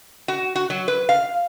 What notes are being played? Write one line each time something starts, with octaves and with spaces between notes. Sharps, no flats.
F#4
F#4
F#3
B4
F5